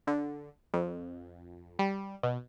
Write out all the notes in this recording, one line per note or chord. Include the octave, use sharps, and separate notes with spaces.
D3
F2
G3
B2